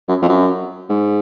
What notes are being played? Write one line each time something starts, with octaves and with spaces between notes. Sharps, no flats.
F#2
F2
F#2
G#2